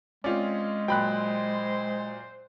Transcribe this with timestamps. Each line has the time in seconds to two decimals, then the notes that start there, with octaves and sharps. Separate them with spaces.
0.24 G#3 C4 C#4 F4 D5
0.88 A#2 F#3 C5 G5 B5 F#6